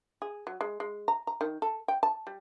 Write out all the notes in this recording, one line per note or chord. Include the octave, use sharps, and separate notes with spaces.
G#4
F#3
G#3
G#3
A#5
A#5
D#3
A4
G5
A5
G3